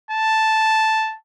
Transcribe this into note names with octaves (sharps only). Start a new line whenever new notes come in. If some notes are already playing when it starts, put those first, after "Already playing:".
A5